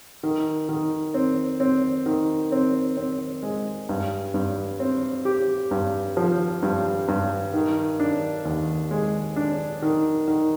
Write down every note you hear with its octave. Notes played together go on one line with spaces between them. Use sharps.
D#3
D#3
C4
C4
D#3
C4
C4
G#3
G2
G2
C4
G4
G2
F3
G2
G2
D#3
D4
D#2
G#3
D4
D#3
D#3